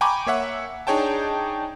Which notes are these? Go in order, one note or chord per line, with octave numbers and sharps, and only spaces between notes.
G5 G#5 A#5 B5 C#6 D6
A#3 C#5 E5 F#5
D4 D#4 G#4 C#5 G5 A5